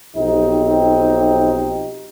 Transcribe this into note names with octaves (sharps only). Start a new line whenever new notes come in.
B1 F3 C4 D#4 G4